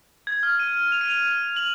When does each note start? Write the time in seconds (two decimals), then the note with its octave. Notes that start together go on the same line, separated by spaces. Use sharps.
0.27 G#6
0.43 F6
0.59 D#7
0.92 F7
1.01 D#7
1.10 F7
1.56 F#7